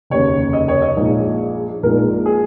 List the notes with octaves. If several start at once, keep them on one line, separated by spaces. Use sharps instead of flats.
F1 D#2 C#3 C#5
D#5
C#5
D#5
A#1 A#2 G#3 D#4
A#1 A#2 G#3 D#4 A#4
G#4